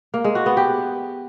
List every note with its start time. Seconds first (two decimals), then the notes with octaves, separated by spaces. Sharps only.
0.14 A#3
0.24 G#3
0.35 F#4
0.46 B3
0.57 G4